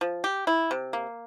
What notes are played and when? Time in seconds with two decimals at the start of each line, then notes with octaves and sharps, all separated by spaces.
0.01 F3
0.24 G4
0.47 E4
0.71 C3
0.93 A#3